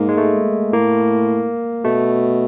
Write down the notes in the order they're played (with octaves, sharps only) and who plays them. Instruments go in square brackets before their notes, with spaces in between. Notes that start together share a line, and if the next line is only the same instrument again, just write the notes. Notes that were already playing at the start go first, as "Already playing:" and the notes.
Already playing: [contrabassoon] G#2 [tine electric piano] A#3
[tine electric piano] G#3
A3
[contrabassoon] A2 [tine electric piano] A#3
[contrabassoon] B2 [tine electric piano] A3